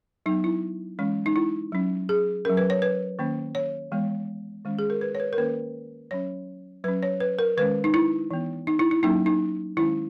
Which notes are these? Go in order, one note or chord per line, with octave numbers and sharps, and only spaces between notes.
F#3 B3 D#4
E4
E3 G#3 C#4
D#4
E4
F#3 C#4
G#4
F#3 C#4 A#4
B4
C#5
B4
D#3 A#3 C#4
C#5
E3 G#3 B3
D#3 G#3 C#4
G#4
A#4
B4
C#5
B4
A#4
D#3 A#3 C#4 B4
F#3 C#4 C#5
F#3 C#4 B4
C#5
B4
A#4
D#3 G#3 C#4 B4
D#4
E4
E3 B3
D#4
E4
E4
F#3 A#3 C#4 D#4
D#4
D#3 G#3 C#4 E4